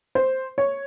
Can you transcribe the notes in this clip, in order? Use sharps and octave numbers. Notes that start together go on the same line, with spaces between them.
C5
C#5